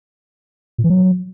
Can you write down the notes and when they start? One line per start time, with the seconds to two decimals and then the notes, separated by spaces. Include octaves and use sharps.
0.78 A#2
0.84 E3
0.90 F#3